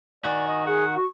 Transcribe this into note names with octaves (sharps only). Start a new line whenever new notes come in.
D#3 F#4 D5 G#5
D#5
G#4 F#5
F#4 C#6